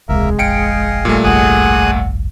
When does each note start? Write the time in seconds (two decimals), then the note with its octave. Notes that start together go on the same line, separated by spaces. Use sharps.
0.09 E1 C#2 C3 G#3 A#3 A#4 E5
0.39 F1 A#1 G#4 D#5 F5 G5 C#7 D7
1.05 A#2 G3 A3
1.24 G1 C2 F2 G#4 F#5 D#6 F#6